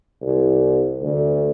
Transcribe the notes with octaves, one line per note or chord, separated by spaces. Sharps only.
C2
D2